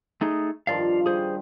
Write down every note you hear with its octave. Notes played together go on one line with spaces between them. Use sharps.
A3 D#4 G#4
G2 D#3 F3 D5 F5
G3 G#4 C5